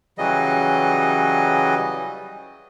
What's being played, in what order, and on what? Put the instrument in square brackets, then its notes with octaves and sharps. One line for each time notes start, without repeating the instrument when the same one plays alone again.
[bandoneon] C#3 E3 F#3 G3 D#5